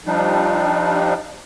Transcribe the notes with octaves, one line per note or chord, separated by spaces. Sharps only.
F3 G3 D4 D#4